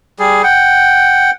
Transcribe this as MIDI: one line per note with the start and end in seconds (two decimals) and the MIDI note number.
0.19 0.42 55
0.19 0.42 68
0.44 1.31 78
0.44 1.31 79